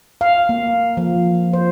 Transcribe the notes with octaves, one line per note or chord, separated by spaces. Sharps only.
F5
A#3
F3
C5